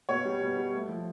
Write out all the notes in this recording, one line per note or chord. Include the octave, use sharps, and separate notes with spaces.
B2 C#5
G3
B2
G3
A3
F3